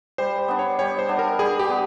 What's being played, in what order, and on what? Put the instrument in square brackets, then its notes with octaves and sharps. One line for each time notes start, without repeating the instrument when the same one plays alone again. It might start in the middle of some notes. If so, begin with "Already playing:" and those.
[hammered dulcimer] G3 [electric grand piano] C5
[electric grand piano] C5
[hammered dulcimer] B3 D4
[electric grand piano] C#5
[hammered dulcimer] G3 [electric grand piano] C#5
[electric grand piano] C5
[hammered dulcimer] B3 D4
[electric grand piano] A#4
[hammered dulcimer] G3 [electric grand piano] G#4
[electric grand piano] G4
[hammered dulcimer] B3